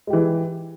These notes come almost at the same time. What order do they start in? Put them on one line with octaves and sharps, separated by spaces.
G#3 G4 E3